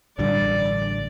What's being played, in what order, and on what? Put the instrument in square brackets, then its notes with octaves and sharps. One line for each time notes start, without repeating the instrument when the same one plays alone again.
[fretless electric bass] A1 G2 D3 [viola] D5